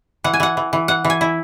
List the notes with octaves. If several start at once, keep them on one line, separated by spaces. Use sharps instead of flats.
E3 F#5
G#5
E3 F#5
E3
E3
E3 F#5
E3
G#5
E4